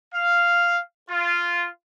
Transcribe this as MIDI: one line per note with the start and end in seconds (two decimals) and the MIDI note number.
0.14 0.80 77
1.09 1.66 65